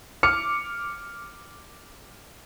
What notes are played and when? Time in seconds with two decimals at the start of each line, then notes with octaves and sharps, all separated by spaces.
0.23 D6 F6 C#7